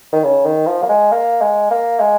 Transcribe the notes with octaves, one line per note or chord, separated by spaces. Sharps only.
D#3
C#3
D#3
F3
A#3
G#3
A#3
G#3
A#3
G#3